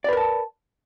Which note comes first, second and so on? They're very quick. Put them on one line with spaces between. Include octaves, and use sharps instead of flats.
D5 B4 A#4 A5